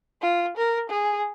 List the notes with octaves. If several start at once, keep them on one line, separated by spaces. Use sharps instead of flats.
F4
A#4
G#4